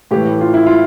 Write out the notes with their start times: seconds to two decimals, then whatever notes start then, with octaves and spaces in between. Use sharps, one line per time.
0.11 A2 E3 G4
0.41 F4
0.54 E4
0.67 F4